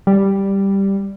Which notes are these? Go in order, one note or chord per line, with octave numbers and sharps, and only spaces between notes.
G3